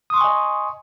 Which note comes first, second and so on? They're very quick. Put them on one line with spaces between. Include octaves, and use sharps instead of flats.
D#6 C6 C#6 G#5 D#5